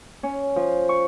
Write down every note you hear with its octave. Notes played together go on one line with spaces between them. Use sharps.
C#4
F3
C#6